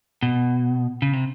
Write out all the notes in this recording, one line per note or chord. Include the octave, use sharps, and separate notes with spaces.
B2
C#3
C3